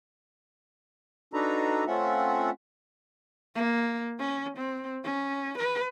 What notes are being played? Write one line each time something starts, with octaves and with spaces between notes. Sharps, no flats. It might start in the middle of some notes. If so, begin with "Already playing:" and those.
D4 D#4 F#4 A4 B4 A#5
A3 C4 C#4 F4 E5 F#5
A#3
C#4
C4
C#4
B4